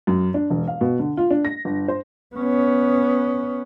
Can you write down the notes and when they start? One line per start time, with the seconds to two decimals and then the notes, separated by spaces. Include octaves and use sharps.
0.07 F#2
0.34 D4
0.50 E1
0.67 F5
0.81 B2
0.99 D3
1.17 F4
1.31 D4
1.45 A#6
1.65 G1
1.88 C5
2.36 B3 C#4